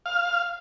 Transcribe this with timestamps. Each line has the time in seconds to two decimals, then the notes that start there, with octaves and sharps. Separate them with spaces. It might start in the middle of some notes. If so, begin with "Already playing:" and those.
0.06 F5